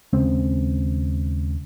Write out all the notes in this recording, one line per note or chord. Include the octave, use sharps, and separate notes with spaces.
D#2 C#3 G#3 C4